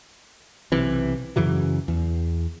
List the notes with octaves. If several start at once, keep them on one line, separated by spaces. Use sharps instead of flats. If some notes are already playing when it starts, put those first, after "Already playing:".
B1 C3 E3
F#2 C#3 E3 F#3
E2